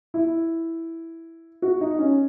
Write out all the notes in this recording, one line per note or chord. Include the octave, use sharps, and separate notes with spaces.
E4
F#4
D#4
C#4